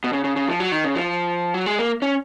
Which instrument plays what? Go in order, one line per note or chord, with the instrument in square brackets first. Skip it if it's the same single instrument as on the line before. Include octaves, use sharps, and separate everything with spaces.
[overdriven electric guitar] B2
C#3
C#3
C#3
F3
F#3
D#3
C#3
F3
F#3
G#3
A#3
C#4